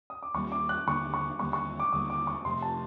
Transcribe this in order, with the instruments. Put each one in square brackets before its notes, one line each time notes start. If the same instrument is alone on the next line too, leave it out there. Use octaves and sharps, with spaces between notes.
[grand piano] D#6
D6
[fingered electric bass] D#2 D3 G3 A#3 [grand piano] C#6
[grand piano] D6
F#6
[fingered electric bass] D#2 D3 G3 A#3 [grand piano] C#6
[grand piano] C#6
[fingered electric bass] D#2 D3 G3 A#3 [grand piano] C#6
[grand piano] C#6
D6
[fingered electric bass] D#2 D3 G3 A#3 [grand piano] D#6
[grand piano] D6
C#6
[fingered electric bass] F2 C3 F3 A3 [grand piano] C6
[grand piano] A5